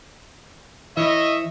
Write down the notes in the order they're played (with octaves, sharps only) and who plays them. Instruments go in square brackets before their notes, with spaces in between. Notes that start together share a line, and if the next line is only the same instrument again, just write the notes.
[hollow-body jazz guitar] E3 [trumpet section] C#5 D#5 E5